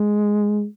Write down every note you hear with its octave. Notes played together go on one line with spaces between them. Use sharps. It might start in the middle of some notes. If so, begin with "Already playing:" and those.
Already playing: G#3